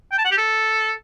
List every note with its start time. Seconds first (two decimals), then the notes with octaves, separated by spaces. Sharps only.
0.12 G5
0.18 A5
0.25 F#5
0.31 G4
0.37 A4